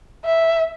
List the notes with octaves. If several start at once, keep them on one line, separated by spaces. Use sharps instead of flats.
E5